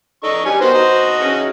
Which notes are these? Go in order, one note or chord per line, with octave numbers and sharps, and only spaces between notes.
A2 D4 D#4 A4 C#6
G3 C#4 B4 C#5 G#5
D#3 B3 F#4 C5
D#4 F#4
C#3 E3 C#4